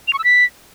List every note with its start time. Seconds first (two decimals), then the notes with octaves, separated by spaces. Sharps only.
0.08 F7
0.13 C#6
0.19 E6
0.24 B6